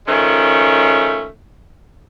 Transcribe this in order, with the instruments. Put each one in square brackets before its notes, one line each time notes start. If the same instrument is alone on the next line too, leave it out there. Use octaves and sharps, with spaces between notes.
[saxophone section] D#3 F3 G#3 A3 C#4